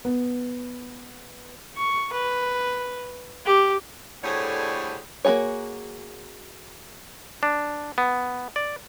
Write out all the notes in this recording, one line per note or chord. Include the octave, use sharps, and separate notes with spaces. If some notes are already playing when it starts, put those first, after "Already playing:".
B3
C#6
B4
G4
A2 D3 G3 G#4 C5 C#5
A#3 D4 F#4 G#4 C#5
D4
B3
D5